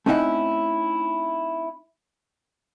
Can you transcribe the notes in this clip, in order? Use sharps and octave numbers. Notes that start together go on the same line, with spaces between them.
A3 C4 C#4 D#4 E4 F#5